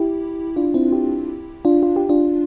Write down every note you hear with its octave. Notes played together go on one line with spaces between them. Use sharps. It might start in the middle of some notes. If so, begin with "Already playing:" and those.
Already playing: E4 G4
D4 F4
C4 E4
E4 G4
D4 F4
F4
G4
D4 F4